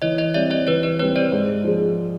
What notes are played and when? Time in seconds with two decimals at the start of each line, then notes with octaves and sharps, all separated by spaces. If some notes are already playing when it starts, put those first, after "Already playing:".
0.02 E3 C#5 D#5
0.18 C#5 D#5
0.34 G3 C4 D5 E5
0.50 C#5 D#5
0.67 E3 B4 C#5
0.83 B4 C#5
0.99 G3 C4 B4 C#5
1.16 C5 D5
1.32 G#2
1.64 F3 G#3